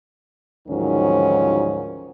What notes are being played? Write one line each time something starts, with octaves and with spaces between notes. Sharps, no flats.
D2 G#2 D#3 F3 F#3 C#4